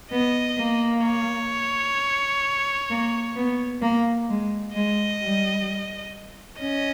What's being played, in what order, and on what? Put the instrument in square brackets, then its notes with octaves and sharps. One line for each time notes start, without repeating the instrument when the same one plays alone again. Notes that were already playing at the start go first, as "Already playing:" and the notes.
[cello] B3 [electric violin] D#5
[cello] A#3
[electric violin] C#5
[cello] A#3
B3
A#3
G#3
[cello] G#3 [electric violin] D#5
[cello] G3
[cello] C#4 [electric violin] D#5